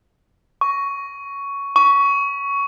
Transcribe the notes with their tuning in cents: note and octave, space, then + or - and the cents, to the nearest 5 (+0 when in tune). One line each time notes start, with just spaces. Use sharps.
C#6 +10
C#6 +15